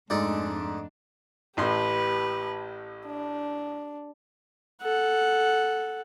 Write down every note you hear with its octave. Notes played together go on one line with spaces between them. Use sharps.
F2 G#2 G#3 A3 D4 D#4 A4 D5
A1 A2 G4 B4 C6
D4
A4 F#5